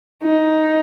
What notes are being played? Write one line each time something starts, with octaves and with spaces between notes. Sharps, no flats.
D#4